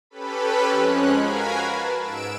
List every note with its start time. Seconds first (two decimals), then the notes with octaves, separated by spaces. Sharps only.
0.10 C#4 G4 A4 B4 B5
0.70 F2 F3 G#3 C#4 F#6
1.12 F#4 A#4 F5 G#5 B5
1.66 B4 A5
1.99 G#2 E6 D7 E7